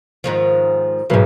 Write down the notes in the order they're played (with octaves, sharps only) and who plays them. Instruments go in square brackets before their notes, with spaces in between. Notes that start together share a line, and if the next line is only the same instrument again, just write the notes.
[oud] G#2 D#3 F3
[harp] B1 G#2 [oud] B2